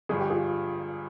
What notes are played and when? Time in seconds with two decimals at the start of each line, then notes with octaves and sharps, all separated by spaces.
0.09 G1 G2 F3 G#4
0.20 G4
0.30 F4 G#4